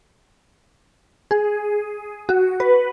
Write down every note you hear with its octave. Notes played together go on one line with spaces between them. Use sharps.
G#4
F#4
B4